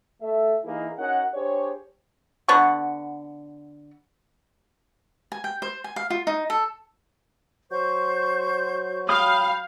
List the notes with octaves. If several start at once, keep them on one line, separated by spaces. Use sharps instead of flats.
A3 A4 E5
E3 A#3 D#4 E4 G#4
C#4 D#4 F#4 A#4 F#5
D4 G4 G#4 C5 C#5
D3 B3 F#5 C#6
G#5
G5
C5
G#5
F5
F4
D#4
A4
F#3 C5 C#6 G6
F5 G5 B5 D#6